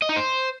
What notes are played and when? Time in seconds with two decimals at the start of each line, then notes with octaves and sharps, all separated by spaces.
0.02 D#5
0.09 D#4
0.16 C5